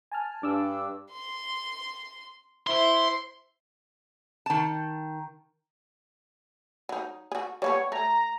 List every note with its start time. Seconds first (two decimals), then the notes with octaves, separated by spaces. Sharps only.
0.12 G#5 A5 F6
0.43 G2 D4 D6 E6
1.12 C6
2.67 E4 C5 C6
4.46 D#3 A5
6.89 F#3 D#4
7.32 F#4 G#4
7.62 G3 A#3 B3 C#5
7.92 A3 A#5